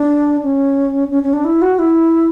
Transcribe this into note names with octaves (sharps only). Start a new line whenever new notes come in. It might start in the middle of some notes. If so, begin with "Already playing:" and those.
Already playing: D4
C#4
C#4
C#4
D4
E4
F#4
E4